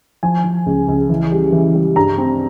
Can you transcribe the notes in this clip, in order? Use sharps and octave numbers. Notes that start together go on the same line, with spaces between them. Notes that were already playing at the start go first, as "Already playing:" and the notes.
F3 G#5
F3
C#2
C#2
E3
G3
E3
G3
G2 A#5
C4